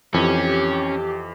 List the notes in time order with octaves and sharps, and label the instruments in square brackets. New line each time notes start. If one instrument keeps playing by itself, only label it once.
[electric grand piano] F2 E3 [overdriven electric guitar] C#4 [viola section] G4